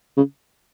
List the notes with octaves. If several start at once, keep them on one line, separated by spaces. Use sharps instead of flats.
C#3